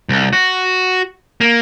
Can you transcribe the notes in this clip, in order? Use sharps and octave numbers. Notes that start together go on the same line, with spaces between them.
C2
F#4
A#3